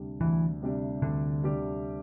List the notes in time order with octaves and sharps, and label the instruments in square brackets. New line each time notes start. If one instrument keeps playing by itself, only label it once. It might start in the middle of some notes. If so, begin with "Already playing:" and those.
Already playing: [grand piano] D2 C3 G3 D4 G4
[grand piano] D2 [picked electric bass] E3
[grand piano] C3 G3 D4 G4
[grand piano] D2 [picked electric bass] D3
[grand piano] C3 G3 D4 G4